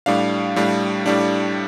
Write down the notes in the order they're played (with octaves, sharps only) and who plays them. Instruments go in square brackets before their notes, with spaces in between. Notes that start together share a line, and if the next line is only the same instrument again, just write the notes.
[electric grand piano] A2 G3 D4 F5
A2 G3 D4
A2 G3 D4